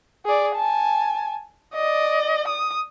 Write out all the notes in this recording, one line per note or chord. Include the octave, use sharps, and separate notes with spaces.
G#4 D5
G#5 A5
D5 D#5
D#6